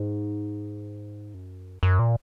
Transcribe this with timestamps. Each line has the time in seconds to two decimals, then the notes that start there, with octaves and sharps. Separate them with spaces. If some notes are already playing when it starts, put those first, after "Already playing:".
Already playing: G#2
1.34 F#2
1.83 F#2
1.99 A#2